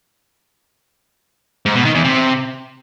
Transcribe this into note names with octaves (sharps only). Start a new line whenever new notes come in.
G#2
B2
D#3
E2
C3